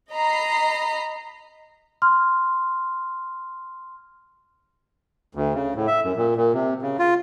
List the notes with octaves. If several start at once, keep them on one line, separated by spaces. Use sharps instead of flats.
D#5 A#5 B5 C7
C6 F6
D2
C#3
A2
E5
F#2
A#2
A#2
C3
C#3
F4